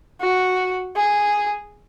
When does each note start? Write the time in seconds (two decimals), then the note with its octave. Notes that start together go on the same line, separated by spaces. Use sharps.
0.21 F#4
0.96 G#4